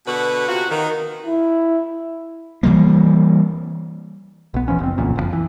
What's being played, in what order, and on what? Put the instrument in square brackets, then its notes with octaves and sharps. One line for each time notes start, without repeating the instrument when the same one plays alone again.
[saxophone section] B2 D3 F#4 B4
C3 F4 F#4
D#3
[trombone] E4
[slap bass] E3 F#3 G3 A#3
[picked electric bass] B1 B3
E1 E3 F3 C#4
F#1 C4
F1 B1 E2 A#2
F#1 B2 F3
E3